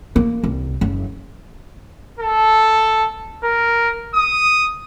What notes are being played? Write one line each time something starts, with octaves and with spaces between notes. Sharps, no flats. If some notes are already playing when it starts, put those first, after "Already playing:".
A#3
C2
F#1
A4
A#4
D#6